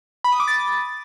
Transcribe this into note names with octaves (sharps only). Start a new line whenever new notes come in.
B5
D#6
D6
A6